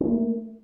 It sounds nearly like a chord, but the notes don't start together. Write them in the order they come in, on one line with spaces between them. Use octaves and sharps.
C#4 A#3 A3